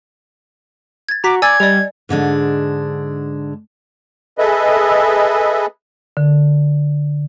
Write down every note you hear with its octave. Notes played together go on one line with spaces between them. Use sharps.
G#6 A6
F#4 A#5 D6 B6
D5 G#5 E6 G#6 A6
G3 D5 D#5 F7
G#2 D3 G#3 D4
G#4 A4 B4 D#5 E5
D3